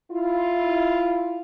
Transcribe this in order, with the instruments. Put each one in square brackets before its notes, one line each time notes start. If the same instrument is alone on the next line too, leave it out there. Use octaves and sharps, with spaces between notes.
[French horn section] E4 F4